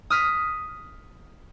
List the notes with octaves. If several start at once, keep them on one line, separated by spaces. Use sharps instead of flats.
D#6 F6 B6